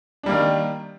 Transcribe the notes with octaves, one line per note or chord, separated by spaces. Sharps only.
D#3 G3 A#3 D4